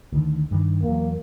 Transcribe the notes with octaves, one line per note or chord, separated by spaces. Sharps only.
D2 D#3
G2 D#3
E2 F#3 A#3